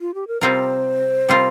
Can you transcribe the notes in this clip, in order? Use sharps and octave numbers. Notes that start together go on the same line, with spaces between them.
F4
G4
A#4
C3 G3 C4 F4 A#4 C5
C3 G3 C4 F4 A#4